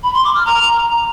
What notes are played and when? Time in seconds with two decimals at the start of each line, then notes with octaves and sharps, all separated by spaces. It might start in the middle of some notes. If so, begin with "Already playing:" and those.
0.03 B5
0.14 C6
0.24 D6
0.35 F6
0.45 A#5